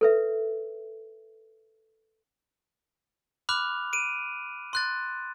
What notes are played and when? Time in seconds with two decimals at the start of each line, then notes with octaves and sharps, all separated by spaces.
0.01 A4 B4 E5
3.49 B5 D6 F6 F#6 F7
3.93 D7 D#7
4.73 C6 F#6 A6